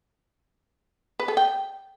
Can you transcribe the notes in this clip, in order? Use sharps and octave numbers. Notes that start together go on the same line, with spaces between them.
B4
A4
G5